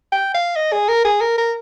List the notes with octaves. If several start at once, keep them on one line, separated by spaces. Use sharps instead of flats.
G5
F5
D#5
G#4
A#4
G#4
A#4
A#4